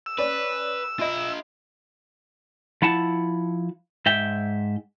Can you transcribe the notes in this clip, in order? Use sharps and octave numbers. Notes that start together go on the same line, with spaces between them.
E6
C#4 B4 D5
F4 D#5 E5 B5
F3 E4 F#5 A5
G#2 E5 G5